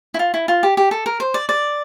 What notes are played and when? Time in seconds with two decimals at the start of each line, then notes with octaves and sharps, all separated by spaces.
0.14 E4
0.19 F4
0.34 E4
0.48 F4
0.63 G4
0.77 G4
0.91 A4
1.06 A#4
1.20 C5
1.34 D5
1.49 D5